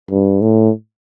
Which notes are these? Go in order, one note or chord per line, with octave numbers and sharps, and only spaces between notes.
G2
A2